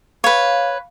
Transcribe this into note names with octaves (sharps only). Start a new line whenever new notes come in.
B4 C#5 F5